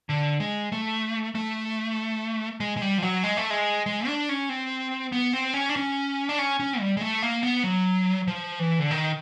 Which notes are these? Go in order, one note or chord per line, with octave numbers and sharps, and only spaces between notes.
D3
G#3
A3
A3
G#3
G#3
G3
F3
F#3
G#3
A3
G#3
G#3
D4
C#4
C4
B3
C4
C#4
D4
C#4
D4
C#4
C#4
G3
G#3
A3
A#3
B3
F#3
F3
E3
D3
D#3